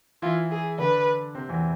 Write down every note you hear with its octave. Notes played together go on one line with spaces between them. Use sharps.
E3 E4 F4
G#4
D3 D4 B4
C3 C4
E2 E3